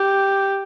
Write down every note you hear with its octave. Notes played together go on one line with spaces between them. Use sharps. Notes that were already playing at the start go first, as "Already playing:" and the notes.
Already playing: G4